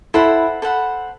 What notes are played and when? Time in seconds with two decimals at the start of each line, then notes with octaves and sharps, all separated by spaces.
0.14 E4 A4 C5 F#5 B5
0.62 A4 C5 F#5 B5